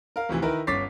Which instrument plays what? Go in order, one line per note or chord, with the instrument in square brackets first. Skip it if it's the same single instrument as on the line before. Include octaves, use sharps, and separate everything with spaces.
[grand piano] A#4 F5
D2 C3 E3 F3
D#3 E4 A#4 B4
G1 C#4 D6 A6 B6 C7